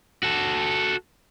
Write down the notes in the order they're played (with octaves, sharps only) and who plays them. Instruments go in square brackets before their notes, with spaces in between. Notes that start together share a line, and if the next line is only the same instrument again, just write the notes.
[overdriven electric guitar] F#4 A4